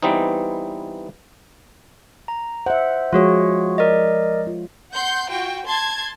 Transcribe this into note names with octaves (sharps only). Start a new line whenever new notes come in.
E3 G3 B3 C4 D#4
A#5
C5 E5 F#5
F3 G#3 F4 F#4 G#4 C#5
A#4 D5 D#5
F4
F#5 C6 G6
F4 F#4 G5
A5 C6 G#6